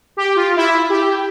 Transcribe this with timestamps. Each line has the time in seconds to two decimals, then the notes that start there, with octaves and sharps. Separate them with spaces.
0.17 G4
0.36 F4
0.57 E4
0.90 G4